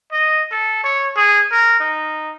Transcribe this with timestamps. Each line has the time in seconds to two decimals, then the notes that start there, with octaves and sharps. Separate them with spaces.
0.12 D#5
0.52 A4
0.84 C#5
1.16 G#4
1.51 A#4
1.80 D#4